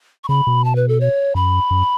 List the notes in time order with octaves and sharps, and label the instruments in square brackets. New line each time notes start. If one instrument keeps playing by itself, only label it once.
[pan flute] C#6
[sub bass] C#3 [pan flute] B5
[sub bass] B2
[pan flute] A5
B4
A4
C#5
[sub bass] F#2 [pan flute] B5
[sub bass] F#2